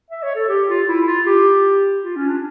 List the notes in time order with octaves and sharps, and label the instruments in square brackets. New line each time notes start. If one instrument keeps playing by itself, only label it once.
[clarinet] E5
C#5
A4
G4
F4
E4
F4
G4
F4
C#4
D4